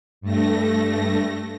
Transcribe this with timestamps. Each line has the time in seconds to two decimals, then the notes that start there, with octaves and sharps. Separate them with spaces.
0.21 G2 A3 A#6